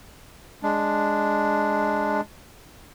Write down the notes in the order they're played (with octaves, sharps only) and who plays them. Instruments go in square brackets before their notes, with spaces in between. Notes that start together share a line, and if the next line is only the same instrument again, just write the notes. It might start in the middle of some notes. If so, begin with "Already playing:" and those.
[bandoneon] G#3 D4